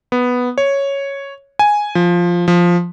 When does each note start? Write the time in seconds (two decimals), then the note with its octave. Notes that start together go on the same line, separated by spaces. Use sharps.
0.12 B3
0.58 C#5
1.59 G#5
1.95 F3
2.48 F3